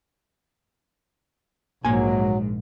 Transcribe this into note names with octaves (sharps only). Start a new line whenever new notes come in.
A#1 G#2 F#3 A#3 G#5